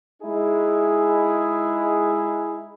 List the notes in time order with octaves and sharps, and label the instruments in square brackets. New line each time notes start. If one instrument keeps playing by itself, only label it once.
[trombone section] G#3 D#4 E4 G#4